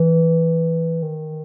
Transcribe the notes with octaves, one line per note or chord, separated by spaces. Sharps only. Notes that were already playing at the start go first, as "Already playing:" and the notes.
Already playing: E3
D#3